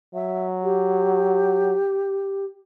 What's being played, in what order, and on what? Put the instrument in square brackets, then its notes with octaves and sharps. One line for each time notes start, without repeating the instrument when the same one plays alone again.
[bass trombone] F#3 [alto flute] E5
[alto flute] G4